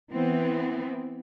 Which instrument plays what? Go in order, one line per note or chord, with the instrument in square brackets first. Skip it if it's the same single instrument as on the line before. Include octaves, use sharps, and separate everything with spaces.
[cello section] E3 B3 C4